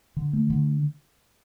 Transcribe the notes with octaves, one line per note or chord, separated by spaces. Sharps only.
D3
A3
D3